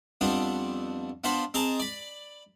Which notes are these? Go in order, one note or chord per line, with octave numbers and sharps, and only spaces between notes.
F2 G3 B3 C4 D4
B3 D4 F4 C5 B5
C4 G#4 A#4 D#5 A5 A#5
D5 B5